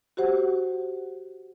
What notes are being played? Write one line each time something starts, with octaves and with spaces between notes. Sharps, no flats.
F#4 G4 C5 F#5